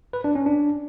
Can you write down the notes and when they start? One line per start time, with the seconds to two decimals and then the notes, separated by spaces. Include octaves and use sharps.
0.13 B4
0.24 D4
0.35 C#4
0.46 D4